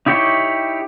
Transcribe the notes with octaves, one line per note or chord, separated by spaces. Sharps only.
D#4 E4 G4 C#5 G5